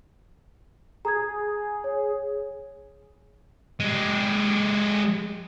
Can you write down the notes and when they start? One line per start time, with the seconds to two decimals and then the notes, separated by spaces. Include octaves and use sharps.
1.05 G#4 A#5 D#6 G#6
1.84 C#5
3.80 G#3 G4